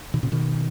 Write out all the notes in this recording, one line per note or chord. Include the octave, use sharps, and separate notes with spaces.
B2 D#3
A#2 C#3
B2 D#3